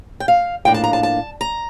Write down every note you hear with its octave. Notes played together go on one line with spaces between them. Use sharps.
G5
F5
A2 F3 A#3 D4 G5
A5
A#5
A5
A5
A#5